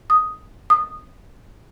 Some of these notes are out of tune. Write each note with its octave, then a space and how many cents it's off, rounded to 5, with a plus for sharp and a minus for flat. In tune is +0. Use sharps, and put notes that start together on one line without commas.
D#6 +5
D#6 -15